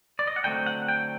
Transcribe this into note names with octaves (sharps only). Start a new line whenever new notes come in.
D5
D#5
F#5
D3 F#3 A3 C4 G5
F#5
G5